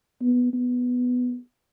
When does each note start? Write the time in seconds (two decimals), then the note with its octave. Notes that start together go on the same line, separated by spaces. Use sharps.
0.22 B3
0.53 B3